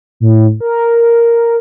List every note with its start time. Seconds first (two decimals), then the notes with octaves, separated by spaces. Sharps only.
0.20 A2
0.61 A#4